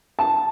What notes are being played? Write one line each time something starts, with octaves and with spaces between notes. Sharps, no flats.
A5